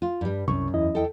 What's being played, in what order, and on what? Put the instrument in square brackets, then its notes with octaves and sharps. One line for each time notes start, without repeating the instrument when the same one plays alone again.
[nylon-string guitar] F4
G2 G3
[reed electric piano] C2 C#6 [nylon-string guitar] F#2
[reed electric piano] E2 E4 D#5
[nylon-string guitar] A4 G5